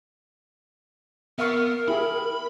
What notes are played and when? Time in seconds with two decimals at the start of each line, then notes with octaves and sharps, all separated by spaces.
1.39 B3 A#4 E5 F5 C#6
1.88 E4 G4 G#4 B5